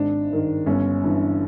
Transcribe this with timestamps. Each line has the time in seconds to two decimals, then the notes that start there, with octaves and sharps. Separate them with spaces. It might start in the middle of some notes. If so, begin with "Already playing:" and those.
Already playing: G#1 D4
0.30 G2 D#3
0.66 G1 C#4
1.04 G2 E3